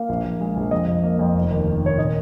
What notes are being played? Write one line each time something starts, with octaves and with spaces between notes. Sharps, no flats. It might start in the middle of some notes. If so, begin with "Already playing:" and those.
Already playing: A#3 F5
A#1
A#1
G#3
A#1
F2 D#5
F2
A#3
F2
F1
D#2
D#3
D#2 C#5
A#2 D#5